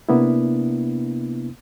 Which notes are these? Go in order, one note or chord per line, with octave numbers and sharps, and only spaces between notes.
C3 A#3 B3 D4 E4